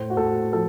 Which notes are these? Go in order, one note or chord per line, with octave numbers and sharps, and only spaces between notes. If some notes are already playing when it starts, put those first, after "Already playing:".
Already playing: A2 C5
F#4
A2 A4
F3 A4